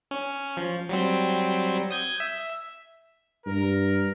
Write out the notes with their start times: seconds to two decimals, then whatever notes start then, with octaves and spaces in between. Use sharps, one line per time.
0.11 C#4
0.57 F3
0.89 F#3 G3 C4
1.91 D#6 G6 G#6
2.20 E5
3.46 G2 A#4